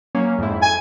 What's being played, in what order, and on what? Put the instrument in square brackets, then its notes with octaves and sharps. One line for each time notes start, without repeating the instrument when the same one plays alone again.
[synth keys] F#3 A#3 C#4
F2 G#2 E4
[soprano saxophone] G#5